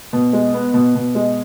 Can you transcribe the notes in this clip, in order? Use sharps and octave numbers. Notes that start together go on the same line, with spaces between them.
B2
G#3
B3
B2
B2
G#3